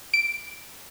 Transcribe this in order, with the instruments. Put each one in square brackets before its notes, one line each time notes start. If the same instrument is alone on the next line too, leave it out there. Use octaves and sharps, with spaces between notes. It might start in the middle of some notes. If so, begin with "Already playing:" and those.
[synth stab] D7